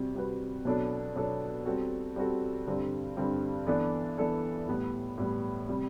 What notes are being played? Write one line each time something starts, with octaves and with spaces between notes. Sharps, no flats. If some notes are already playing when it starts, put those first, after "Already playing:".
Already playing: C3 G3 C4 F#4
C3 G3 C4 F#4 B4
B2 F#3 B3 D4 A4
B2 F#3 B3 D4 A4
G3 C4 F#4 A4
G3 C4 F#4 A4
G2 D3 G3 C4
G2 D3 G3 C4
E3 B3 D4 A4 D5
E3 B3 D4 A4 D5
A2 G3 B3
A2 G3 B3
C3 G3